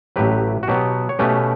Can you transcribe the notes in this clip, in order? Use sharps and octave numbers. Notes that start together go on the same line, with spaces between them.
A1 A2 F#3 G4 B4
F#4
B2 F#3 B3 G4
C#5
B2 A3 C#4 G4 B4